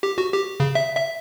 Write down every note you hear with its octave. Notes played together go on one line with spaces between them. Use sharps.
G4
F#4
G4
C#3
E5
E5